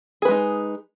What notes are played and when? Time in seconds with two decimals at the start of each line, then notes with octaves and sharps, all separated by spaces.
0.22 G#4
0.25 B4
0.28 G#3
0.31 D#4